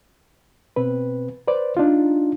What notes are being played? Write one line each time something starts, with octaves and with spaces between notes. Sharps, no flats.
B2 C4 B4
B4 C5 D5
D4 D#4 F4